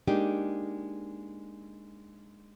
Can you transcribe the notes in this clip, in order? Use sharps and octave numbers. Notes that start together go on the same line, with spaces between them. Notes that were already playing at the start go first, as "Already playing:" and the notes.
G#3 A#3 D4 D#4 G4